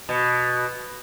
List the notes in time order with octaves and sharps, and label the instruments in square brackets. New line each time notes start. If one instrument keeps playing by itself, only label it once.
[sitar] B2